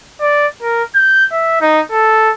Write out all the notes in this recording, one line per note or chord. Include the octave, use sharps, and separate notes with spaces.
D5
A#4
G6
E5
D#4
A4